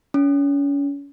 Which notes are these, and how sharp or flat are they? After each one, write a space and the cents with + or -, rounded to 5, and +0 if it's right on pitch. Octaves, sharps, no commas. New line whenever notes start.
C#4 +30